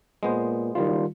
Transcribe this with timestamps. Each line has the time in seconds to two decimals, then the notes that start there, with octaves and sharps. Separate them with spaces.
0.23 A#2 G#3 B3 C5
0.75 F#1 D#3 G3 F4